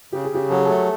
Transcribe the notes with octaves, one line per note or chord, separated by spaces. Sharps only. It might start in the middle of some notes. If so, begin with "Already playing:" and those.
C#3 G4
G#4
C#3 G4
F#3 A4
G#4
A3 A4